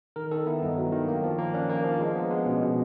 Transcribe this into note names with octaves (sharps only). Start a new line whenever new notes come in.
D#3 A#4
D#3 A4
B3 E4
G2 D#4
F#3
D#3
A#3
F3
A#3
C#4 D4
A#3
F3
G#3
B3
G#3
B2 C#4
B2